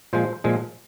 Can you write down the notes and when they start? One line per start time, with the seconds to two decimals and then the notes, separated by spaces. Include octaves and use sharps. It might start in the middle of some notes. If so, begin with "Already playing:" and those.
0.13 A#2 F3 G#3 C5
0.44 A#2 F3 G#3